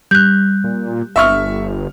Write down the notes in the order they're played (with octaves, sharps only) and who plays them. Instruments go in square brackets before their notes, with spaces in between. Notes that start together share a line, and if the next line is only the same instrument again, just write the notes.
[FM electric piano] G3 [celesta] F#6 G6
[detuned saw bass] A#2
[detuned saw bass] G1 [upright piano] E5 C#6 F6